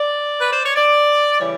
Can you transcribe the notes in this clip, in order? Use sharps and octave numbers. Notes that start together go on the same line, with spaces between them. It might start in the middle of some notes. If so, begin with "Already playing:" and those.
Already playing: D5
B4
C5
C#5
D5
C#3 E3 G3 C#5